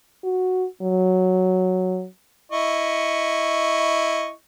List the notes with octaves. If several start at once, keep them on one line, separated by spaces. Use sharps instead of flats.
F#4
F#3
E4 D#5 C#6